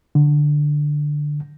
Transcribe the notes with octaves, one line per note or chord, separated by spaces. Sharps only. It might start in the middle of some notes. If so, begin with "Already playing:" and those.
D3